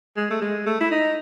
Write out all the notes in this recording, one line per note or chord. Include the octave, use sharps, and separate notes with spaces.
G#3
A3
G#3
A3
E4
D#4